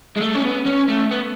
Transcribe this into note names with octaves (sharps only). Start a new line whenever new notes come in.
G#3
A3
C#4
B3
C#4
A3
B3